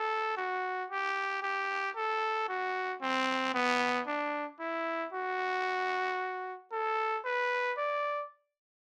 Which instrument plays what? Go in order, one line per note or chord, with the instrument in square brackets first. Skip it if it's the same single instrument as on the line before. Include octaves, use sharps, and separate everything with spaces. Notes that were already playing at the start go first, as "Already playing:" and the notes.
Already playing: [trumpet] A4
F#4
G4
G4
A4
F#4
C4
B3
D4
E4
F#4
A4
B4
D5